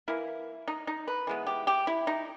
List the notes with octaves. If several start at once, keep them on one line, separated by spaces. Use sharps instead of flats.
E3 A#3 E4
D#4
D#4
B4
E3 G#3 B3
G4
G4
E4
D#4